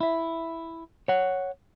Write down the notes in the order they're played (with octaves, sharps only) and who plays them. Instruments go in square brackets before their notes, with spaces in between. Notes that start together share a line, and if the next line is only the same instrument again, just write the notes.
[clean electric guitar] E4 E5
C#5 F#5